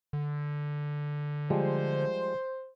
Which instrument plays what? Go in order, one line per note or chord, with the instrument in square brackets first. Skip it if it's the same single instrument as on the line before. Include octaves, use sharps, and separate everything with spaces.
[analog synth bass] D3
[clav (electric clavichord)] F3 G3 G#3 [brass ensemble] C5